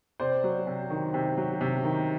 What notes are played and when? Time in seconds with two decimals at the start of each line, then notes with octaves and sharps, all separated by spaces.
0.20 C3 C5 D5
0.44 F#3
0.66 C3
0.90 D#3
1.14 C3
1.37 F#3
1.61 C3
1.84 D#3